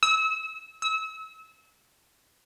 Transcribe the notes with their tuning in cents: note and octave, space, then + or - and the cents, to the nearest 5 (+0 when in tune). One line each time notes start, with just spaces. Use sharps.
E6 -35
E6 -35